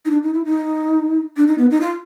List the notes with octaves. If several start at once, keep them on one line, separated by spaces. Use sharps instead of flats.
D#4
D4
D#4
E4
D#4
D4
D#4
B3
D#4
F4